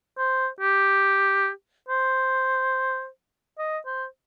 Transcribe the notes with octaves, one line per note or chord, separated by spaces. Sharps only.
C5
G4
C5
D#5
C5